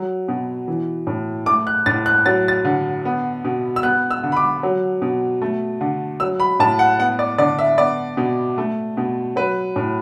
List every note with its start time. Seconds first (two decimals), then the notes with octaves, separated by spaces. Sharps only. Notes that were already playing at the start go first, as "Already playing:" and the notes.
Already playing: F#3
0.28 B2
0.68 E3
1.07 A2
1.46 A3 D6
1.67 F#6
1.86 A2 A6
2.06 F#6
2.26 F#3 A6
2.48 A6
2.65 D3
3.05 B3
3.45 B2
3.76 E6
3.83 B3 F#6
4.11 E6
4.24 D3
4.32 B5
4.36 D6
4.63 F#3
5.02 B2
5.42 A3
5.81 D3
6.20 F#3 E6
6.40 B5
6.59 A2 A5
6.79 F#5
6.99 B3 F#5
7.19 D5
7.38 D3 D5
7.59 E5
7.78 B3 D5
8.17 B2
8.58 A3
8.97 B2
9.36 F#3 B4
9.76 A2